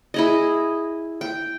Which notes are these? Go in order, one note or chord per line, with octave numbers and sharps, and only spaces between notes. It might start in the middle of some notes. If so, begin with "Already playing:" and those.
E4 G#4 D#5
G5